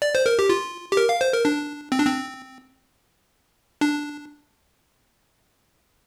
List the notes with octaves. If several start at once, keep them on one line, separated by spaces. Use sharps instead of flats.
D5
C5
A#4
G4
F4
G4
A#4
F5
C5
A#4
D4
C4
D4
C4
D4